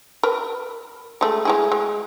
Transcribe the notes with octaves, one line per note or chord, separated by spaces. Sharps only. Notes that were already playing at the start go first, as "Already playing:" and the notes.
A#4 B4
G#3 A3
G#3 E4 G#4
G#3